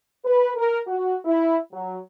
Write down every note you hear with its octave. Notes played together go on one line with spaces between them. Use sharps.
B4
A#4
F#4
E4
F#3